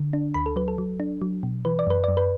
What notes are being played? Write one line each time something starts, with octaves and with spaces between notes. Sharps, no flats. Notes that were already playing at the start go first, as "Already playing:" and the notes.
Already playing: D3
D4
D2 B5
A4
F#3 B4
A4
F#3
D4
F#3
B2
E3 B4
D5
F#2 B4
F#2 D5
B4